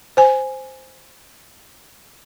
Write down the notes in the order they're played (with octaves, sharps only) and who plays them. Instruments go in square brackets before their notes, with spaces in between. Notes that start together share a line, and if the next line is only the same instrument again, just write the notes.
[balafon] C5 G#5